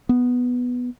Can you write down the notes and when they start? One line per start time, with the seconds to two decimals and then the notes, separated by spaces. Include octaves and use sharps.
0.09 B3